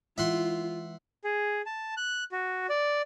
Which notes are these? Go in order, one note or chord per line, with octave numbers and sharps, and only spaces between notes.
E3 G#3 F4 E5 F#5 C6
G#4
A5
F#6
F#4
D5